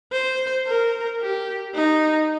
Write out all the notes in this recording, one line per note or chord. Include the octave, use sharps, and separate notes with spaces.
C5
A#4
G4
D#4